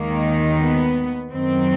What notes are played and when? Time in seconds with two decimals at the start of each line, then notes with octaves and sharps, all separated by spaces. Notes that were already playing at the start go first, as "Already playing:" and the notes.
Already playing: D#2 D#3 G#3 A#3
0.61 B3
1.32 F#2 D#3 F#3 C4